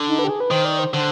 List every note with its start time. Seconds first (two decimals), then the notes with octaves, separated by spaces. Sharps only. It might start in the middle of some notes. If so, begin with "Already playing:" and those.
Already playing: D3
0.08 D#4
0.19 B4
0.24 G4
0.30 G#4
0.40 B4
0.51 D#3 C5
0.65 D5
0.79 C5
0.94 D3 C5